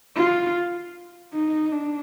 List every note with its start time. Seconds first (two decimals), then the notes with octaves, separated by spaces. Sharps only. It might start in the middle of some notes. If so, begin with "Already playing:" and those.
0.16 F4
1.34 D#4
1.72 D4